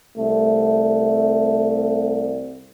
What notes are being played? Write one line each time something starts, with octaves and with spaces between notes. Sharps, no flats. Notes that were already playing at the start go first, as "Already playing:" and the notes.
C2 A3